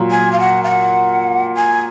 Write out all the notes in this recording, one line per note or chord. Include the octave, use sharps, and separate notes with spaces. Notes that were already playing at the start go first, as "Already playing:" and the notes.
Already playing: A#2 F#3 A#3
G#5
F5
F#5
F5
F#5
G#5